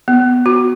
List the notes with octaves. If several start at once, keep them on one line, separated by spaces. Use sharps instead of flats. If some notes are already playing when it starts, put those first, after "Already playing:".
B3
F#4